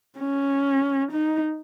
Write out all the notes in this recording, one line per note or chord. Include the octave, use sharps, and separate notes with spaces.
C#4
D#4